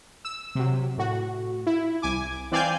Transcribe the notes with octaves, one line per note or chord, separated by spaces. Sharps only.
E6
C3 F#3
A2 F#4
E4
C2 G#5 D6
E3 C4 D5 F5 G#5 G6